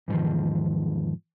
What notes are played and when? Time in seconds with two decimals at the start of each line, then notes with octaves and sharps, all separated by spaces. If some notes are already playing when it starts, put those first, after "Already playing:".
0.08 E2 G#2 D3 D#3 F3